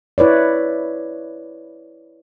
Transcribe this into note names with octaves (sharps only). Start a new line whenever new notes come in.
E4 B4 C#5 D5